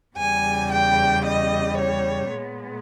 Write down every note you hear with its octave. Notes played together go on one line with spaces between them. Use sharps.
E2 C#3 G3 G#5
G5
D#5
C#5
A#2 G#3 B3